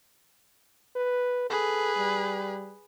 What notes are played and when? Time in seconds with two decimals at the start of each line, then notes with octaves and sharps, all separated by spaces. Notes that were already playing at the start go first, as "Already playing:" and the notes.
0.96 B4
1.50 G#4 A4 B4
1.97 G3